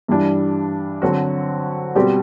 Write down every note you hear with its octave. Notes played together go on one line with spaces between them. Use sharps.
G2 E3 G3 D4
D3 F#3 C4 F#4
B2 G3 C4 G4